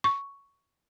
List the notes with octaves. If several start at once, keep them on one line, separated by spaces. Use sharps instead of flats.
C#6